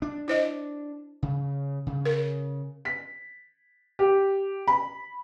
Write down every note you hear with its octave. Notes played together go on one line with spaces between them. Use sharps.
D4
E4 C5 D#5
C#3
C#3
A#4
B6
G4
B5